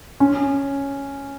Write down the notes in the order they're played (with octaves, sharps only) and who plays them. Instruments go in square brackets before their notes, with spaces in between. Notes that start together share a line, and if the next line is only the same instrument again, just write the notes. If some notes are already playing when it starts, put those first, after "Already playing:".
[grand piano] C#4